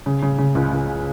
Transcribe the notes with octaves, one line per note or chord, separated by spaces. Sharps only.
C#3
C#3
C#3
C#2
C#2